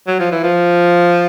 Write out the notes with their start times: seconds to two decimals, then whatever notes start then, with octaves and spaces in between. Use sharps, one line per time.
0.07 F#3
0.19 F3
0.32 E3
0.44 F3